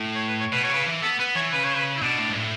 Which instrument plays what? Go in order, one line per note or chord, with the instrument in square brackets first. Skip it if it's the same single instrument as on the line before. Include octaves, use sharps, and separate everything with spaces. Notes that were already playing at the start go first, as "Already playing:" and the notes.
Already playing: [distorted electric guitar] A2
[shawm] C#5
B4
C#5
[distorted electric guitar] B2 [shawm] B4
[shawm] C#5
[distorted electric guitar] C#3 [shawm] B4
[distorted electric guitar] E3
[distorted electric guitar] B3 [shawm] A4
[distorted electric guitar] B3 [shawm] B4
[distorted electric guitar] E3 [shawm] C#5
[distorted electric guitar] C#3 [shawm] B4
[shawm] C#5
B4
E4
[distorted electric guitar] B2 [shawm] D4
[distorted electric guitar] A2
G#2
A2